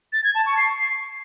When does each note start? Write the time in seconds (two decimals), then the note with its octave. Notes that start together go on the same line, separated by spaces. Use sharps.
0.13 A6
0.24 G#6
0.35 A5
0.46 C#6
0.57 C7